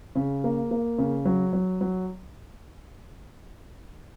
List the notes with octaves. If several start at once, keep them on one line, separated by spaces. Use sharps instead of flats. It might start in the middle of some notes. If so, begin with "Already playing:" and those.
C#3
A#3
A#3
C#3
F#3
F#3
F#3